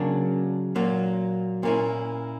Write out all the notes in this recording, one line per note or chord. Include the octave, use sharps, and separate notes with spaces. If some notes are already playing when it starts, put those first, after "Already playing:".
Already playing: C#3 F#3 A#3 D4
A#2 F#3 A#3
A#2 A#3 C#4 E4